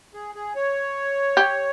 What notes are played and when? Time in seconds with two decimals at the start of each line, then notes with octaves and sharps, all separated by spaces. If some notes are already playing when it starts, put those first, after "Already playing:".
0.14 G#4
0.35 G#4
0.55 C#5
1.37 G4